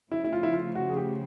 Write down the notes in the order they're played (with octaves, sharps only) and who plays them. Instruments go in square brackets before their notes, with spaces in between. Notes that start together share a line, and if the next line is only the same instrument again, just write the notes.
[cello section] C#3 F3 A3 [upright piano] E4
[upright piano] E4
F4
E4
F4
F#4
G#4
G4